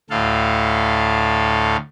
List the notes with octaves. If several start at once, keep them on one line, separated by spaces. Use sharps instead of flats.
D2 A2 A4 F5